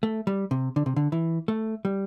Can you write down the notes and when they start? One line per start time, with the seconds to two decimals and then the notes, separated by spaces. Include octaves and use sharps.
0.03 A3
0.27 G3
0.51 C3
0.76 D3
0.86 C3
0.96 D3
1.12 E3
1.48 A3
1.85 G3